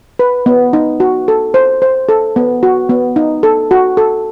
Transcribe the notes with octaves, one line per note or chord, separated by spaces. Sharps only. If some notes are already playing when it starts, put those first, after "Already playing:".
B4
B3
D#4
F#4
A4
C5
C5
A4
B3
F#4
B3
D#4
A4
F#4
A4